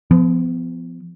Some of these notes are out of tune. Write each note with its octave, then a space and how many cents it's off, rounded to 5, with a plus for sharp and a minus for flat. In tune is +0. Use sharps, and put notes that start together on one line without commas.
F3 -10 B3 +35